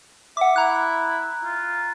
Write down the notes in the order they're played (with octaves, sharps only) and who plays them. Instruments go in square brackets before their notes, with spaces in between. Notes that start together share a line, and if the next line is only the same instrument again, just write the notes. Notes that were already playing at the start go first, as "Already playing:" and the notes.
[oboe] E5 [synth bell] F#5 D6
[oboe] E4 [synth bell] A#5 F#6
[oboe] F4